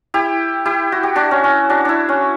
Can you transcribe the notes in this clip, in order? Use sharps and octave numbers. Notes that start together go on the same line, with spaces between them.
E4 G4
E4 G4
F#4
G4
D4 F#4
C#4
C#4
D4 F#4
D4 E4
C#4